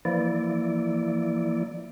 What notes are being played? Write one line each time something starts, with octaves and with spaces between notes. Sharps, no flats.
E3 F3 A#3 E4 D5